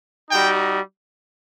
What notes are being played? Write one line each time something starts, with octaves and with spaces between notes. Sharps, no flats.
G3 D#4 F#4 G5